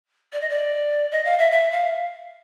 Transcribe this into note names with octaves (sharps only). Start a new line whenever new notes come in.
D5
D#5
D5
D#5
F5
E5
E5
F5